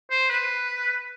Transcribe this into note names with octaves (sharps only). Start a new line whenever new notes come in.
C5
B4